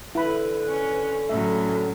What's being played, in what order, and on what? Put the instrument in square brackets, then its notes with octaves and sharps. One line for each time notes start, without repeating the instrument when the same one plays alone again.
[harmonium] D3 [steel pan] E4 B5 [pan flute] B4
[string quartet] C#4
[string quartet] A2 F#3 [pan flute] C#4 [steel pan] E5